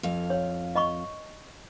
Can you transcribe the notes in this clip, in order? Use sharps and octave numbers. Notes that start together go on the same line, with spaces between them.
F2 F5
C#5
D#5 B5 C#6